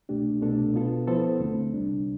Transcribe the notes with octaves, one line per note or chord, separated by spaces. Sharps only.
C2 B2 A3 D4 G4
C2 B2 A3 D4 A4
B2 B3 F4 A4
F3 B3 E4 A4 C5
D2 D3 A3 C4
C2 C3 G3 D4